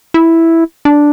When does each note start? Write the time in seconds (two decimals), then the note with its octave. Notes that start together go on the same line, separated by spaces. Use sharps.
0.14 E4
0.85 D4